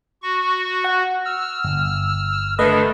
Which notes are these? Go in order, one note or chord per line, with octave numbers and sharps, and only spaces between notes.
F#4 C#6
F#5
E6 F6
G1
D3 D#3 A3 D4 B4 D#5